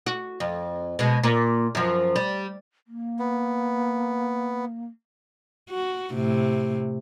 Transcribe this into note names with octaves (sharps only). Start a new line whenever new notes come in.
F#4
F2
B2 G#3
A#2
F#2 F3
G3
A#3
B3
F#4
A2 C3